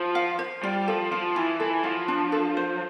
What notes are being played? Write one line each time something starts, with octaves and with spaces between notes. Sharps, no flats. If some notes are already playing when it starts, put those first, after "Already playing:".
Already playing: F3 C5
F5
C5
G3 F4
F3 A4
F3 F4
E3 F4
E3 A4
F3 F4
D4
A4
C5